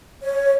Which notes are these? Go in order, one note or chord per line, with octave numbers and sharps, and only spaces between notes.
C#5